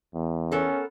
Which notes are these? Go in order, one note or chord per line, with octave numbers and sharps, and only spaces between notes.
E2
B3 C#4 A4 A#4